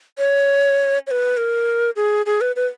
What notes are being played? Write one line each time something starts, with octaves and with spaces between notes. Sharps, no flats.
C#5
C#5
B4
A#4
G#4
G#4
B4
B4